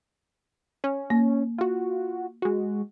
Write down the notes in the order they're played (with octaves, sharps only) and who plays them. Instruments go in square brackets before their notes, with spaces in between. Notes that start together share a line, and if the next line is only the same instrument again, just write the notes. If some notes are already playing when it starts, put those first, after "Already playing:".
[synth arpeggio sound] C#4
[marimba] A#3
[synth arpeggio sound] F4 F#4
G#3 F#4